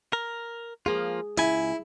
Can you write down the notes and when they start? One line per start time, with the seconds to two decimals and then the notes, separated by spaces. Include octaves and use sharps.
0.13 A#4
0.86 F3 A#3 F4 G#4
1.38 C#2 E4 G#5